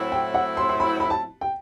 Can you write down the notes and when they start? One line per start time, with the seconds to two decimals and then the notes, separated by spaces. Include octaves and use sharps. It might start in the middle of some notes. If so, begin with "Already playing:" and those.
Already playing: A2 F#3 C4 E4
0.12 G5
0.34 F#5
0.57 C6
0.69 C6
0.80 B5
1.00 B5
1.10 A5
1.41 G5